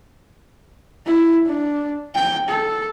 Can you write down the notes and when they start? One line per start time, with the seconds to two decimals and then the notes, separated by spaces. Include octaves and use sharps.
1.07 E4
1.47 D4
2.15 G5
2.48 A4